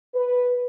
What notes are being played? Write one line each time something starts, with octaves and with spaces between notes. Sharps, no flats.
B4